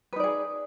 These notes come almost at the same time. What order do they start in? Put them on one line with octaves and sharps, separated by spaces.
B4 D#4 D5 G#4